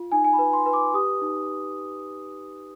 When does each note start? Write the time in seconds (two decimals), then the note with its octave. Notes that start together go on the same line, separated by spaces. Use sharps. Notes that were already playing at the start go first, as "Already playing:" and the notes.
Already playing: F4
0.12 D#4 G#5
0.24 G#5
0.33 B5
0.39 B4
0.53 C6
0.66 B4
0.73 D6
0.94 G4 D#6
1.21 D#4